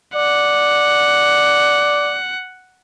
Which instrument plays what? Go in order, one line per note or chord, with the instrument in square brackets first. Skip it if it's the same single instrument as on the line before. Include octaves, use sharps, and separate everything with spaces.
[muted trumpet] D5 [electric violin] F#5